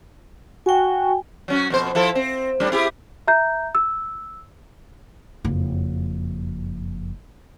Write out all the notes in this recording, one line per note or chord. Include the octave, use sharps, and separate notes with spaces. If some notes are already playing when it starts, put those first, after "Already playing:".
F#4 G5 G#5
F#3 C#4 F#4
F2 B2 C5
F3 E4 A4
C4
A2 G3 D4
E4 G4 G#4
E5 A#5 G6
E6
F#1 F2